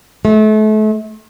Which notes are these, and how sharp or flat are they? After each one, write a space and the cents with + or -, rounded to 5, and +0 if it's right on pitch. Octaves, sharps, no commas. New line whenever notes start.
A3 -35